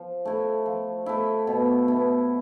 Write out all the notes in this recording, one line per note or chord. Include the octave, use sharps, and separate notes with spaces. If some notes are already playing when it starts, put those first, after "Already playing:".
Already playing: F3
A3 E4
F3
A3 E4
B2
B3 E4